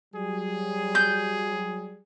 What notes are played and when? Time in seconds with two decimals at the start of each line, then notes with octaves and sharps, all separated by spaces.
0.14 F#3 G3 G#4
0.95 G6